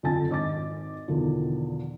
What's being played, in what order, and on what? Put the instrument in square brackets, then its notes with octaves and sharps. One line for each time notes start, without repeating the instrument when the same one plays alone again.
[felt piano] F2 D3 F4 G#5 A5 A6
G#1 D#5 D6 A6
E2 B2 D3 D#3 F3